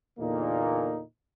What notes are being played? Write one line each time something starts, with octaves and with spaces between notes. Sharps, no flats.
E2 A#2 D3 A#3 D#4